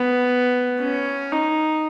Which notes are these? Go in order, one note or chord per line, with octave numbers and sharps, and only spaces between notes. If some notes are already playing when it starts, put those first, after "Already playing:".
Already playing: B3
C#4
D#4